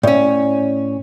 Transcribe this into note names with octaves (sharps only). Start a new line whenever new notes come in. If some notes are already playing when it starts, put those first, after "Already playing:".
A2 C#4 D5